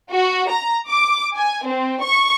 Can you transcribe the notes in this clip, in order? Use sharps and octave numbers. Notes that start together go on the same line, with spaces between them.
F#4
A#5
D6
G#5
C4
C#6